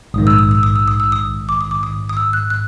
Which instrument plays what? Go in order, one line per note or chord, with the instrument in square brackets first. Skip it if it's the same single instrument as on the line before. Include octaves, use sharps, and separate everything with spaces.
[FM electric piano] A#1 G#2 D#3 [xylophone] D#6
[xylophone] E6
D#6
E6
D#6
E6
D#6
E6
D#6
D6
D#6
D6
D#6
D#6
E6
F#6
F#6